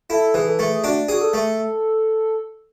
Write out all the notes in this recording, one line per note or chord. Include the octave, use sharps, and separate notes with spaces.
E4 A4
E3 G#4
A4
A3 G#4
G#4
D4 F#4
F#4 G#4
A4
A3